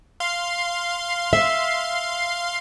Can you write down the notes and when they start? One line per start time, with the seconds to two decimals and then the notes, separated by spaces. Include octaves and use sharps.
0.20 F5 C6
1.33 E5